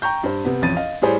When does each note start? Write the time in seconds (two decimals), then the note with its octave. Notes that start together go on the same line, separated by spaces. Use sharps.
0.02 G5 A#5 C#6 G6
0.23 G2 C5
0.45 C3 B3
0.62 A1 F2 A6 D#7
0.77 D#5 F5
1.02 A2 G3 G#4 C5 C#5